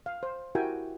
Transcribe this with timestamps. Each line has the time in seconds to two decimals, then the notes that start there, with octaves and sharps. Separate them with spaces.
0.06 F5
0.23 C5
0.55 E4 F#4 G4 A#4 G5 G#5